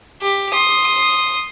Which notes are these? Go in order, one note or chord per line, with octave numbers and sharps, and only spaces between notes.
G4
C6 D#6